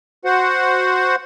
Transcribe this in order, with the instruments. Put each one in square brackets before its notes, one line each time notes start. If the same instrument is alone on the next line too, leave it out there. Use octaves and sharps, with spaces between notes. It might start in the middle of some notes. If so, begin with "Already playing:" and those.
[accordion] F#4 C5 F#5